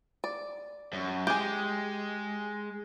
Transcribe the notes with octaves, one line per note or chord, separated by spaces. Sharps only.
D5
F#2
G#3 G4 G#4